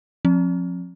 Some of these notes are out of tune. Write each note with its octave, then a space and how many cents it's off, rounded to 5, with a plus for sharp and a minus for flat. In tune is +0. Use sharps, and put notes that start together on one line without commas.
F3 +30 C4 +40